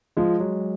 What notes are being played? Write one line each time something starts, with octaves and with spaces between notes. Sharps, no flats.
F3 G#3
F#3